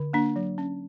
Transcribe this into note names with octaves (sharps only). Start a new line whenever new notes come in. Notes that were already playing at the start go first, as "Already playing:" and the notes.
Already playing: D3
A#3 D4
F#3
C#4